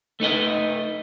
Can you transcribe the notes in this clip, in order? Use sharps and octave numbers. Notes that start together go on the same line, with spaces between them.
A3 D#4 B4 D#5